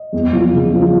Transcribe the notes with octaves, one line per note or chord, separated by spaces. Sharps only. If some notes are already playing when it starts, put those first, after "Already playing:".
Already playing: D#5
E2
F3
C#3
F3